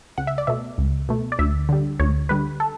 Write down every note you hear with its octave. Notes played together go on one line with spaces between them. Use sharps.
C#2 F#5
E5
D5
B2 A3 E5
C#2
B2 A3
D5
D2 E5
D3 G3
D2 C#5
D3 G3 B4
A4